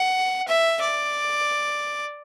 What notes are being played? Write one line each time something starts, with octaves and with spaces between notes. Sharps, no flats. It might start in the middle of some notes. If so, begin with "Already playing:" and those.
Already playing: F#5
E5
D5